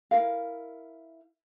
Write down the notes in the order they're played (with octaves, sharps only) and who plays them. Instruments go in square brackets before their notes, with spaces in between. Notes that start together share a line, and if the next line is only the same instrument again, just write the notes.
[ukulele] E4 A#4 F5